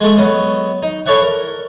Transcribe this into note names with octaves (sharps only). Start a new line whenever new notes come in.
G#3 A3
F#3 B3 D#5
D#4
E4 A4 C#5 D5 E5 F#5
A#4